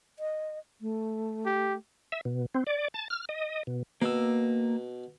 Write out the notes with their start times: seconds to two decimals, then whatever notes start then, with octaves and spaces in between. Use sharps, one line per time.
0.19 D#5
0.81 A3
1.46 G4
2.12 E5
2.25 B2
2.55 C4
2.67 D5
2.94 A5
3.10 F6
3.29 D#5
3.67 B2
4.02 B2 A#3 E6